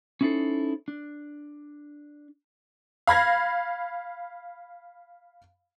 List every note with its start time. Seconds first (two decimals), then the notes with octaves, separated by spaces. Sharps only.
0.21 C#4 D#4 E4 G4 A4 C5
0.88 D4
3.07 F5 B5 G#6 A#6